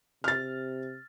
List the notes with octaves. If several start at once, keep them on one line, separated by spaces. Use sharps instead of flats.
C3 F6 A6